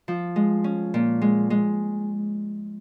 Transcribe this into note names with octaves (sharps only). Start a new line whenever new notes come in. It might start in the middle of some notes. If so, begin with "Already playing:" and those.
F3
G#3
C#4
A#2
G#3
G#3